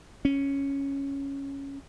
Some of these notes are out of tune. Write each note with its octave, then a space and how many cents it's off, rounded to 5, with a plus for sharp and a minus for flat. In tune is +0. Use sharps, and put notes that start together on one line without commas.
C#4 +0